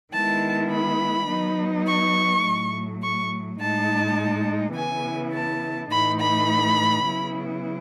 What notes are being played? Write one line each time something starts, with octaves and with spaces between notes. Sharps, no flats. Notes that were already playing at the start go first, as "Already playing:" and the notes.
D#3 G#3 B3 E4 A5
B5
F#3 B3 D#4
C#6
A2 F#3 A3
C#6
A2 G#3 D#4 A5
C#3 E3 B3 E4 G#5
A5
A2 E3 A3 D#4 B5
B5
C#3 F#3 B3 E4